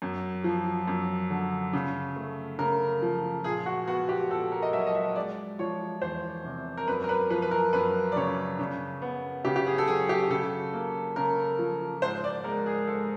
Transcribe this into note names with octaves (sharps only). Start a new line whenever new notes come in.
F#2
F3
F#2
D3
C#3
A3
C#3 A#4
F3
A#2 G#4
F#4
B3 F#4
G4
A#2 A4
A#4
D#5
F#3 E5
D#5
E5
G#3 D5
F3 C#5
E2 C5
C3
A#4
F#2 B4
A#4
B4
F3 B4
B4
A#4
F#2 B4
D5
C#3 C#5
C#3
B3
C#3 G4
G4
G#4
A4
F#3 G#4
G4
C#3 A4
A#3
C#3 A#4
F3
G#2 C5
D5
G#3 A#4
G#4
G#2 A4